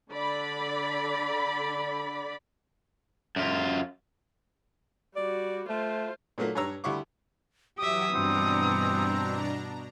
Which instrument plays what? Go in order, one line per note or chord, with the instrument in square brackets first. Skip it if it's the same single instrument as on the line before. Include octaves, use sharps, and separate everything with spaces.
[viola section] D3 D5 B5
[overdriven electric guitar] F#2 F4
[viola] G3 F#4 [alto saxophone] D5
[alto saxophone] A3 [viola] F4 C5
[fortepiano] A#2 F#3 A3 A#3
G2 G4 C#5 A#5 E6
D2 G3 E4 C#6 D6
[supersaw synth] E3 F#3 [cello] G4 E5 [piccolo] D#6
[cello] G2 E3 [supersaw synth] B2 D4 A#5 [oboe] C4